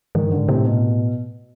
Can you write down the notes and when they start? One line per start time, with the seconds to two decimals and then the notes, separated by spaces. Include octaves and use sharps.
0.15 G#2 D#3
0.26 G2
0.32 D3
0.37 G#2
0.48 A2 C3
0.65 B2